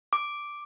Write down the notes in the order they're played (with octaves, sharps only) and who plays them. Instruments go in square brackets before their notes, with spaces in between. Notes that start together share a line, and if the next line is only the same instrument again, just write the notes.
[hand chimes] D6